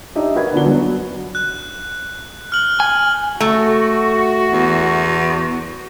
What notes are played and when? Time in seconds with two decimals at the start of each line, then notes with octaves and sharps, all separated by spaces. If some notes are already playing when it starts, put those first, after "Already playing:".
0.15 D4 D#4 G4 D#5 E5
0.35 F#4 A#4 B4 F#5 G#6
0.53 D3 B3 D4 F#4 G7
0.66 F#3 B3 D4 F#4
1.35 F#6
2.52 F6 F#7
2.80 G#5
3.40 A3 F#4
4.52 E2